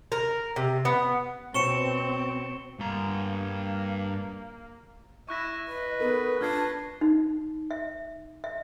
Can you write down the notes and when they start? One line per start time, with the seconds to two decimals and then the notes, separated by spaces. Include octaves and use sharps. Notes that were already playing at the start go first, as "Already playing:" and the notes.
0.12 A#4
0.56 C3
0.85 B3
1.54 B2 C4 C#5 C#7 E7 G7
2.79 G2 A#3 A#5
5.29 E4 C#6 F#6 A#6
5.68 B4 D#5
6.00 B3 D#4 A4 A#4
6.41 D4 F4 A5 F6 G#6 C7
7.01 D#4
7.71 E5
8.44 E5